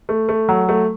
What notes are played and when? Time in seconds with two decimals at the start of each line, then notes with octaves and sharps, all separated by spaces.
0.09 A3
0.29 A3
0.49 F#3
0.69 A3